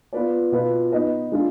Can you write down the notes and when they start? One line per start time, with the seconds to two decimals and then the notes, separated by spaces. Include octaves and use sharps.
0.13 B3 F4 B4 D5
0.52 B2 B3 F4 B4
0.92 B3 D#4 B4 D#5
1.32 G#3 D4 F4